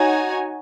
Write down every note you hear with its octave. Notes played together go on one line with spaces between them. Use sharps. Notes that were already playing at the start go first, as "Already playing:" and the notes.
Already playing: D#4 F#4 C#5 G#5